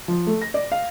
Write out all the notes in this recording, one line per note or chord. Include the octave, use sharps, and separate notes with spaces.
F3
A3
A#6
D5
F5